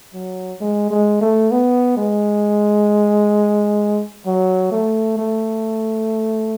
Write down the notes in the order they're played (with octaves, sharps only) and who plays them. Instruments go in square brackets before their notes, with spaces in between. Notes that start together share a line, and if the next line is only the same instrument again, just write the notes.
[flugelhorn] F#3
G#3
G#3
A3
B3
G#3
F#3
A3
A3